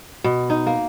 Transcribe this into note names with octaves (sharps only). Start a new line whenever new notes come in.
B2
D#4
A#3